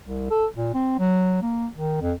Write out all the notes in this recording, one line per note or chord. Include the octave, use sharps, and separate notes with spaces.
C2
A4
A#2
C4
F#3
A#3
D#3
F2